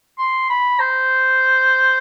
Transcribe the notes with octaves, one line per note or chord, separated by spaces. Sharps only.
C6
B5
C5